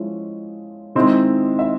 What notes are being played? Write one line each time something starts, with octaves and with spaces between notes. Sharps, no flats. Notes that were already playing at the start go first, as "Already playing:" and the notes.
Already playing: F3 G#3 C#4 E4
D#3 G#3 C4 E4
E5